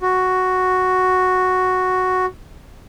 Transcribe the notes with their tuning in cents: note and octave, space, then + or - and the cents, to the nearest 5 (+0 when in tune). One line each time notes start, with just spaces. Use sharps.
F#4 +0